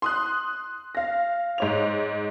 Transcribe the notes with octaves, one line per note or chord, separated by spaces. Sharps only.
C6 D#6 F#6
F5 A#6
G#2 C#5 F7